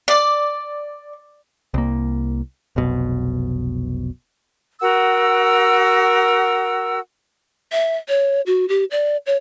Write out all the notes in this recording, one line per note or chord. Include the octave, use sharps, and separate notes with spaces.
D5
C2 A#3
F1 B1 B2
F#4 A#4 F#5 E6
E5
C#5
F#4
G4
D5
C#5